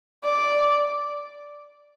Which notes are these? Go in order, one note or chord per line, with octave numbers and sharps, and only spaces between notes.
D5